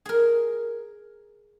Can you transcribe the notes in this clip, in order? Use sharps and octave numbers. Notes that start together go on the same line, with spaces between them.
G#4 A#4